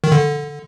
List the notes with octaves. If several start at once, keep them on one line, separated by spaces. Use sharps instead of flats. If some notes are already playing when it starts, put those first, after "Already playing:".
D#3
D3